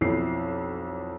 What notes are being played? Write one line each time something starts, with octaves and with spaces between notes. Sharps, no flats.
B1 F2 E4 C7